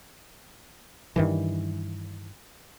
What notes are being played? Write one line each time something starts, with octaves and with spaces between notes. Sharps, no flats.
G2 D#3 E3